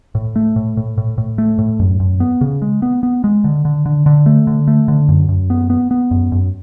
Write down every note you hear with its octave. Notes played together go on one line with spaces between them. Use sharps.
A2
A3
A2
A2
A2
A2
A3
A2
F#2
F#2
B3
C#3
G#3
B3
B3
G#3
D3
D3
D3
D3
A3
D3
A3
D3
F#2
F#2
B3
B3
B3
F#2
F#2